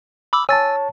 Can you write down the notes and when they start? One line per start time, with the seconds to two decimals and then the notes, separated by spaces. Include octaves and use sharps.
0.33 B5 D6 E6
0.49 C#5 G#5 A5 E6 A6